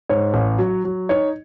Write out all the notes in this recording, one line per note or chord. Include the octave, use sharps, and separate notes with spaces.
G#2 C#5
A1
F#3
F#3
D#4 C#5